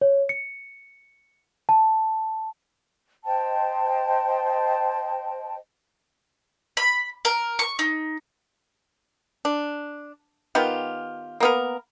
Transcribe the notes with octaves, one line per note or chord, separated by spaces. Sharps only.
C#5
C#7
A5
C5 D#5 G5 A5
B5
A#4
C#6
D#4
D4
D#3 B3 F4 G4
A#3 B3 A#4